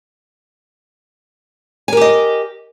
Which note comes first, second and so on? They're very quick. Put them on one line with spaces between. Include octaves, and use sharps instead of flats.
G#5 A#4 G4 D#5